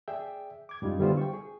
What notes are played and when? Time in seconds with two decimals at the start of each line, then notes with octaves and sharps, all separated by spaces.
0.08 G#4 D5 E5 G5
0.69 D6 G#6
0.82 F#2 G3 D#4 F4
0.99 D3 G3 B3 E4 F4 C5
1.17 G5 C#6
1.33 G#4